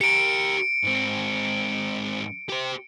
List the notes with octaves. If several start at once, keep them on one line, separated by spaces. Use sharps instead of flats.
G4 A#4 C#7 D7
G#2 C4
G4 C5